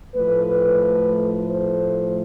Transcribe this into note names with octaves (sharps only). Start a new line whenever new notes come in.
A2 F3 A3 B4
C5